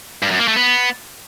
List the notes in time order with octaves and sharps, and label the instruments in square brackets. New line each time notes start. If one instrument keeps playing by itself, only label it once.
[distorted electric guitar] G2
F#2
A#3
A3
B3